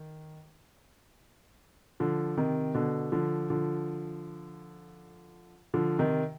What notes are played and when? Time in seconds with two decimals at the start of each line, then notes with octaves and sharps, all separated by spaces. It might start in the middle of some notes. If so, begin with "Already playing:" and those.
Already playing: D#3
2.00 D3 F3
2.37 C3 D#3
2.75 B2 D3
3.12 D3 F3
3.50 D3 F3
5.74 D3 F3
5.99 C3 D#3